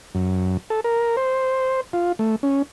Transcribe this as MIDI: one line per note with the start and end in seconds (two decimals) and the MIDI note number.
0.15 0.57 42
0.70 0.80 69
0.84 1.16 70
1.17 1.81 72
1.93 2.12 65
2.19 2.36 57
2.43 2.62 61